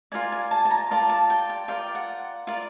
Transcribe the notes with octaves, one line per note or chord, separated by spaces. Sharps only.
F4 A#4 D5 G#5
G#5
A5
A5
A#5
F4 A#4 D5 A5
A5
G5
G5
F4 A#4 D5 G5
F#5
F4 A#4 D5